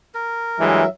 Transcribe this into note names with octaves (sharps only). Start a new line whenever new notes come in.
A#4
G2 E3 F#3 G#3 E5